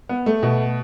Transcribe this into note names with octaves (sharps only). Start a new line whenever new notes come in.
B3
A3
B2